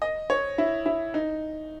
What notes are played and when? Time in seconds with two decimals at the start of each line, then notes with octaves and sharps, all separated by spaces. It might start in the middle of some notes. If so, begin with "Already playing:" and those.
0.02 D#5
0.30 C#5
0.58 E4
0.86 E4
1.14 D#4